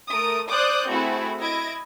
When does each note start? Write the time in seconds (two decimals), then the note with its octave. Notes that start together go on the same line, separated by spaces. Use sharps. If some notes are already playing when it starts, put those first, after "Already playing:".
0.11 A3 A#4 D#6 D7
0.51 C5 D5 D6 D#6 F#6 G6
0.88 A3 C4 E4 F#4 G#4
1.39 E4 D#5 G#6 A#6 D7